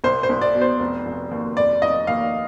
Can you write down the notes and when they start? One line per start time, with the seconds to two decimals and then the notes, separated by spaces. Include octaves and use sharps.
0.04 C2 C5
0.23 C5
0.29 C2
0.41 D5
0.55 B2
0.61 C5
0.80 F1
1.06 F1
1.31 D#2
1.57 F1 D5
1.82 F1 D#5
2.07 D#2 F5